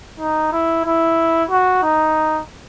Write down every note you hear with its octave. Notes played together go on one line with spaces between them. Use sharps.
D#4
E4
E4
F#4
D#4